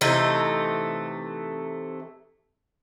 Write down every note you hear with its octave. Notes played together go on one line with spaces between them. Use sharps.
C3 E3 A3 D#4